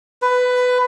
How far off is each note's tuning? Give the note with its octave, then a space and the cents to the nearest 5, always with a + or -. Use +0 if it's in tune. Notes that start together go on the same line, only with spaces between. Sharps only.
B4 +15